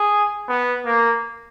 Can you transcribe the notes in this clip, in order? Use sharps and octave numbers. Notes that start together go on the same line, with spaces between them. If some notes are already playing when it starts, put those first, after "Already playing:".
Already playing: G#4
B3
A#3